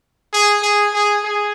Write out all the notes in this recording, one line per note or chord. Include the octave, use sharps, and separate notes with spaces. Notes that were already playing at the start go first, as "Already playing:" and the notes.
G#4
G#4
G#4
G#4